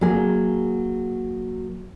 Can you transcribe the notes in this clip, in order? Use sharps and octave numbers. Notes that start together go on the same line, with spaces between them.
F#3 A#3 G#4